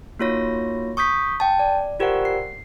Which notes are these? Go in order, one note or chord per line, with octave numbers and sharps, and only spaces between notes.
A#3 D#4 F4 F#4 C#5 A#6
C#6 D#6 G6 B6
G5 A5
D5
F4 G4 A#4 C5 D5 F#5
C7